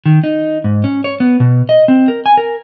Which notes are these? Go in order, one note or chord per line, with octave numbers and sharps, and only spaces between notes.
D#3
D#4
G#2
C#4
C#5
B3
B2
D#5
C4
A#4
G#5
A#4